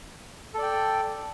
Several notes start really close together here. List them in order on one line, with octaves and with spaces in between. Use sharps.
A4 D5 G5